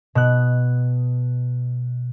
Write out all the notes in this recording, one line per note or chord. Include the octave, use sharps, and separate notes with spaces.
B2 F#6